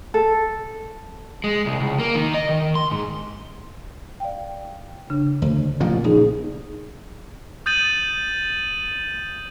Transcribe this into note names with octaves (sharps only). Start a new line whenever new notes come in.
A4
G#3
C2
C#2
A#3
D#3
D#5
D#3
C6
G#2
D5 F5 G5
C#3 D4
D2
A1 A#2 F3
A#1 C#4 D#4 G#4
D#6 G6 A6 D#7 F#7